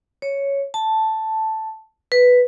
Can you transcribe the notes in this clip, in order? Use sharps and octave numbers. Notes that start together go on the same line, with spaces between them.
C#5
A5
B4